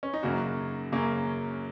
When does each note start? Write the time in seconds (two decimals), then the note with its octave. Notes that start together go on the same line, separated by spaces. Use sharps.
0.03 C#4
0.14 D#4
0.23 F#2 C#3 A#3 C#4 F#4
0.92 F#2 C#3 A#3 C#4